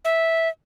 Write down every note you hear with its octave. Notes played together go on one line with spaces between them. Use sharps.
E5